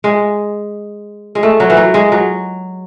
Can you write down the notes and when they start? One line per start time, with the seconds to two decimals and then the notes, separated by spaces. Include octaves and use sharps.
0.04 G#3
1.35 G#3
1.43 A3
1.60 F#3
1.70 E3
1.77 F#3
1.94 G#3
2.12 F#3